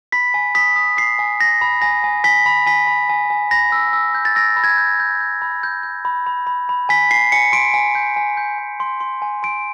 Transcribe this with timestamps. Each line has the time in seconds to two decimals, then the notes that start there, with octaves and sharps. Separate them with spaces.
0.12 B5 B6
0.34 G#5
0.55 D#6 B6
0.76 D#6
0.97 D#6 C7
1.19 G#5
1.40 G#5 A#6
1.61 B5
1.82 G#5 A#6
2.04 G#5
2.24 G#5 B6
2.46 B5
2.66 G#5 B6
2.87 B5
3.10 G#5
3.30 G#5
3.51 B5 A#6
3.72 E6
3.93 E6
4.15 G6
4.25 A6
4.35 E6 A#6
4.56 B5
4.64 G#6
4.78 G6
5.00 G6
5.21 G6
5.42 B5
5.63 G6
5.83 G6
6.05 B5
6.27 B5
6.47 B5
6.69 B5
6.89 G#5 B6
7.11 G#5 C7
7.32 G#5 C#7
7.53 C6 D7
7.74 G#5
7.95 G6
8.16 G#5
8.37 G6
8.58 G#5
8.80 C6
9.00 C6
9.22 G#5
9.43 C6 D7